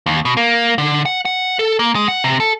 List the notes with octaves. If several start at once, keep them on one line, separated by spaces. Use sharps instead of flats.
D#2
B2
A#3
D3
F#5
F#5
A4
A#3
G#3
F#5
C3
A4